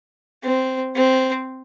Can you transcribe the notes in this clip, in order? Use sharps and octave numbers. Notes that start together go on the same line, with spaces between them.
C4
C4